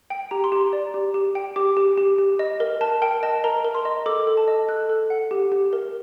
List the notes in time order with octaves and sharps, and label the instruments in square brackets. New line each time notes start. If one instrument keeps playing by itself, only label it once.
[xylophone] G5
G4 A#5
C6
G4 A#5
D5
G4
G4
G5
G4 D6
G4
G4
G4
D#5
A#4
A#4 A5
A#4 G5
D#5 A5
A#4 A#5
A#4
C6
D#5
A4 D6
A4
A5
D#5
A4 F#6
A4
F#5
G4
G4
A#4